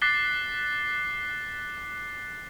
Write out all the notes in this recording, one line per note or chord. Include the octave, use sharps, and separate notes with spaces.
D6 F#6 A6 B6 C7 G7